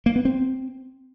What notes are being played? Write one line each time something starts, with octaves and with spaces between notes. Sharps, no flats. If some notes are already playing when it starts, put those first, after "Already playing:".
A#3
B3
C4